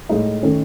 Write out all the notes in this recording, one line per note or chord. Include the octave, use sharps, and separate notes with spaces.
A2 G#3 D#4
D#3 A3 C#4